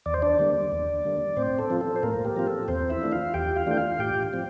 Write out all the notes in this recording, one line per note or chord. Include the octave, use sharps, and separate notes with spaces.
E2 D5
C5
D4 D5
D3 G3 A#3 D4
E2
D3 G3 A#3 D4
A2 C4 C5
A4
F3 C4 F4
A4
C5
A2 A#3 A#4
G4
F3 C4 F4 A#4
A4
E2 C4 C5
E4 E5
E3 A3 D4 F4
F4 F5
E2 G4 G5
F4 F5
E3 A3 D4 F4 G5
F4 F5
A2 G4 G5
F3 C4 F4